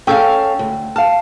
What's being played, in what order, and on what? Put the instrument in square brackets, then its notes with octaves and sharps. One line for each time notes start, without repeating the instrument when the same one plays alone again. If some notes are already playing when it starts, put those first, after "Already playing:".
[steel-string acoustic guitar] C#4 A4 F5 [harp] G5 E6
[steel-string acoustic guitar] D2
[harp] F5 F6 [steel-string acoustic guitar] A5